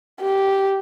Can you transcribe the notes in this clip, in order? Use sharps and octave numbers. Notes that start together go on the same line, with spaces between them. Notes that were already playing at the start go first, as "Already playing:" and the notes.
G4